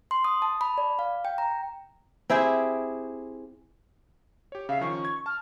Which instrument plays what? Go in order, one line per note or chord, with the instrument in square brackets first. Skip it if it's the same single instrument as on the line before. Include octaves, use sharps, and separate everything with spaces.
[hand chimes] C6
D#6
A5
B5
D5
F5
G5
A#5
[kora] C4 E4 G4 G#4
[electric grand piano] G4 C#5
[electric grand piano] C#3 E5 [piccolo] F5
[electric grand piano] D#3 F3 C#4 [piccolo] C#6
[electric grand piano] G#6
[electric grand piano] A5 [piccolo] F6